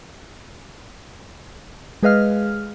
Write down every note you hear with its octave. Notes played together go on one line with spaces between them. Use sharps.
G#3 G#4 B4 D#5 F5 F6